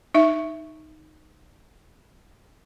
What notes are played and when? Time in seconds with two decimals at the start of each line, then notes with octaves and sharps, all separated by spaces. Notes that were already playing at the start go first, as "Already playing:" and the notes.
0.14 D#4 E5